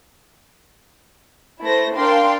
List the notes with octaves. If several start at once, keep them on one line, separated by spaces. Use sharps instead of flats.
A3 E4 B4 C5 A#6
D4 A#4 F5 G5 C6